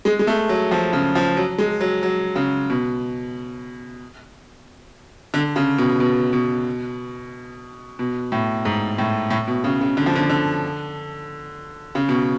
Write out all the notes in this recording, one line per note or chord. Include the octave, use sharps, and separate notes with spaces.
G#3
G#3
A3
F#3
F3
C#3
F3
F#3
G#3
F#3
F#3
C#3
B2
D3
C#3
B2
B2
B2
B2
A2
G#2
A2
A2
B2
C#3
C#3
D3
F3
D3
D3
C#3
B2